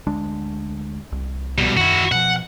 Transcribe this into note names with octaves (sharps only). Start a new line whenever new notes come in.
D2 G#3 D4
C2
B2 G3
F#2 D#3 E4 F#4
B2 F3 F#5